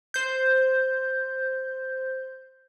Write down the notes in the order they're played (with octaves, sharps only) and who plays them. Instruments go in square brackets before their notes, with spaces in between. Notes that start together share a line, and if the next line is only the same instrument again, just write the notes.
[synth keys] C5 G6